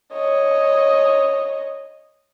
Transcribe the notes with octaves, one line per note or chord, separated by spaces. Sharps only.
C#5 D#5